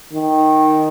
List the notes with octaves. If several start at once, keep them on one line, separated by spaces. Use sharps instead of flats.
D#3